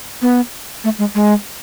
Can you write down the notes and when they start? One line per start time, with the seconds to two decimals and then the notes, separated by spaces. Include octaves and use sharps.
0.22 B3
0.84 A3
0.98 G#3
1.15 G#3